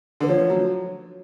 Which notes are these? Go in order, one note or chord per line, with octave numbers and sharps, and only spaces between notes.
D3 B4
F3 C#5
F#3